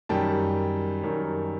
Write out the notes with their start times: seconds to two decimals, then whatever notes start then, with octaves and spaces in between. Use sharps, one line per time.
0.09 F#2 D#3 G3 G5 A5
1.04 F#2 D#3 G3